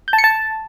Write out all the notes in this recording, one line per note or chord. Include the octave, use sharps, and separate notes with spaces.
G6
A5
C#7
A5